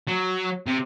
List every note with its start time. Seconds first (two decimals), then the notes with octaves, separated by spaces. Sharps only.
0.08 F#3
0.67 C3